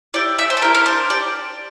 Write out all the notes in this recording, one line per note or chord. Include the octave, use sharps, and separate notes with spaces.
E4 G4 D5
A3 E5
C5
A4
E4 G4 A#4
A#4
D4 C5
G4 D5